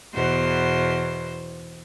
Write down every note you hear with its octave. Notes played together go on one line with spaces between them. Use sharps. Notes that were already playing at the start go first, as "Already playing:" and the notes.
E2 B2 C5